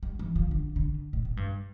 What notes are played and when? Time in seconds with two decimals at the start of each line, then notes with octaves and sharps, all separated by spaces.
0.03 G3
0.19 E3
0.36 F3
0.51 D3
0.76 D3
1.13 A2
1.25 A2
1.37 G2